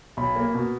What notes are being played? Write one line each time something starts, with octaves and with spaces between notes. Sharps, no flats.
B1 B5
A#3
B2